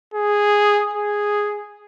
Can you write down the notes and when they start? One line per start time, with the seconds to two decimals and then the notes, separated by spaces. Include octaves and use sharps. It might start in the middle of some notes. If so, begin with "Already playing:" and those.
0.14 G#4
0.93 G#4